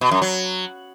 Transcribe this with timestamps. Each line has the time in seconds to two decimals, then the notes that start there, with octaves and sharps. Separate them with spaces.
0.01 B2
0.11 F#2
0.22 F#3